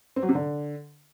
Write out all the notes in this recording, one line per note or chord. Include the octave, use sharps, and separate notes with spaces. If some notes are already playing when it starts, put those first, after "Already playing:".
C4
F#3
C3
D3